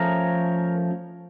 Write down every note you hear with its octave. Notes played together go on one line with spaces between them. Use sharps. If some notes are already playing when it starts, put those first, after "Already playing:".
Already playing: F3 A3 C#4 A#4 C#5